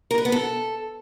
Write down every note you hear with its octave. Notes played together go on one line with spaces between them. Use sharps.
A#4
B4
B3
A4